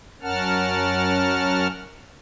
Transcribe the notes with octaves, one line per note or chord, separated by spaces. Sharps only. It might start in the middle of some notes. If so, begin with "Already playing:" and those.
F#2 C#4 A#4 F#5 A5 F6